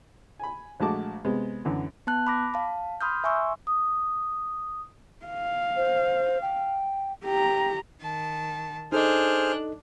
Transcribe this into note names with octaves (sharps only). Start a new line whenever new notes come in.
G#5 B5
A#1 G#3 A3 F#4 A5 D6
C3 G#3 B3
F#2 D3 E3
B3 A5 F#6
B5 D6 A#6
F5 A5
B5 C6 D#6 F6 G6
E5 G#5 C6 C#6 E6
D#6
F5
C5
G5
G4 G5 A#5
D#3 A5
D4 D#4 G#4 A4 C5 D#5 F6 F#6